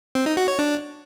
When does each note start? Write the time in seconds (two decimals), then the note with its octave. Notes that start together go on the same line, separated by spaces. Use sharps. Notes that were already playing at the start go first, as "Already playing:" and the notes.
0.15 C4
0.26 D#4
0.37 F#4
0.48 C#5
0.59 D4